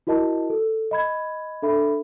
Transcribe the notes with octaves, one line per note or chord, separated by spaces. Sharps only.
E4 F#4 A#4 D#5 A5
A4
D#5 B5 G#6
D4 A4 E5 B5